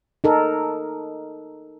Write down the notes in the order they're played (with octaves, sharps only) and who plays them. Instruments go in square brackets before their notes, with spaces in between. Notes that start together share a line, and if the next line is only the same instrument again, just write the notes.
[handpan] D#4 A4 A#4